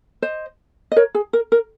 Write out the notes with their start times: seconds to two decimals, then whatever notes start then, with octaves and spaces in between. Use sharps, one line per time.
0.22 C5 D#5
0.92 D#5
0.96 A#4 C#5
1.15 G#4
1.33 A#4
1.52 A#4